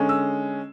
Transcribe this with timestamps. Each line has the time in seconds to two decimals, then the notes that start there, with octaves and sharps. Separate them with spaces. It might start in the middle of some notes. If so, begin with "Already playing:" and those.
Already playing: D3 G#3 C#4
0.09 E6